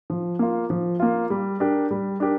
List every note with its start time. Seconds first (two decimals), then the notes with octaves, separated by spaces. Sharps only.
0.10 F3
0.39 A#3 F4
0.70 F3
1.00 A#3 F4
1.30 G3
1.60 D4 G4 A#4
1.91 G3
2.20 D4 G4 A#4